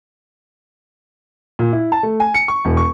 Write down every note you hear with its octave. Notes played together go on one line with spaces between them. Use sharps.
A#2
E4
A5
A3
G#5
C#7
C#6
E1
C#6